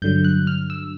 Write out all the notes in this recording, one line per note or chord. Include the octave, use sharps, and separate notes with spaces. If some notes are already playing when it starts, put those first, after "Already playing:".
G2 D3 F#3 G6
F#6
F6
E6